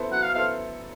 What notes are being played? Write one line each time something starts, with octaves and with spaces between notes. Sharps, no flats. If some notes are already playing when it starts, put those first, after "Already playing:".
Already playing: B3 E4 A4 C5
F#3 F#5
F5
B3 E4 A4 C5 F5